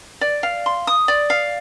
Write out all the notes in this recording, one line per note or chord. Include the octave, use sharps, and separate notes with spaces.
D5
F5
C6
D#6
D5
F5